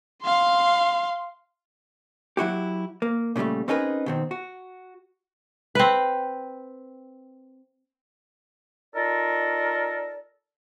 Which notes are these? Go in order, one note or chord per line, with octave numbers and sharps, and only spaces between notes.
F5 C6
F#3 E4 F#4 G4
A#3
A#2 C#3 F3 G3 A3
C4 C#4 D#4 G#4 A#4 B4
B2 D#3 C4
F#4
C4 B4
D#4 F4 A4 A#4 D5